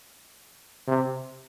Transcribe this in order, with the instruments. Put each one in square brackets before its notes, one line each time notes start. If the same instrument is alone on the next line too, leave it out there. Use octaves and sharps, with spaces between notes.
[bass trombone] C3